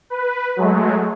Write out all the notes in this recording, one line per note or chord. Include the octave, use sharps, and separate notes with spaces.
B4
F#3 G#3 A3